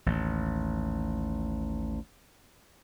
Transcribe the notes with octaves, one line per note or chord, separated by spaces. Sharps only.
A1 D#2